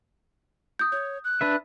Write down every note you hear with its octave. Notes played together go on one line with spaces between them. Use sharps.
D#6 G6
C#5 G6
F#6
D4 B4 E5